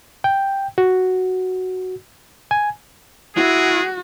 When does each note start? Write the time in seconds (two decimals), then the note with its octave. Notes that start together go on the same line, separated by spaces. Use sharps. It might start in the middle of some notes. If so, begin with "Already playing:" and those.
0.24 G5
0.78 F#4
2.51 G#5
3.36 G#3 E4 F#4 G#4